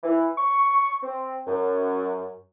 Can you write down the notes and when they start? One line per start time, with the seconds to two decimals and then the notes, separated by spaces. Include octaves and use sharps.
0.03 E3
0.37 C#6
1.03 C4
1.47 F#2